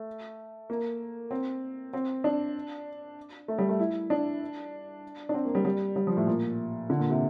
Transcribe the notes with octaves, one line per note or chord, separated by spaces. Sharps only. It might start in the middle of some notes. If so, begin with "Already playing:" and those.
Already playing: A3
A#3
C4
C4
D4
A3
G3
A3
E4
D4
D4
C4
A#3
G3
G3
G3
F3
A2
A#2
D3
A#2
C3